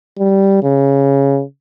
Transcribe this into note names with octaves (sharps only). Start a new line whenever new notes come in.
G3
C#3